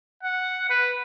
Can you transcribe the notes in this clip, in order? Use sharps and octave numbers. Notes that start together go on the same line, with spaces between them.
F#5
B4